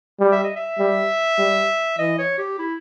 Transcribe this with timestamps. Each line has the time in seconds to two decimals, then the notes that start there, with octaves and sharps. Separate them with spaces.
0.20 G3
0.32 E5
0.44 D#5
0.56 E5
0.79 G3
1.39 G3
1.99 E3 D#5
2.18 C#5
2.38 G4
2.59 E4